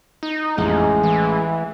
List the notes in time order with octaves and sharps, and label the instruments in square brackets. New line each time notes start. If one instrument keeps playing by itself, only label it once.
[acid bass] D#4
[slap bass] A1 [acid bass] F2 [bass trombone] G#3
[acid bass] E3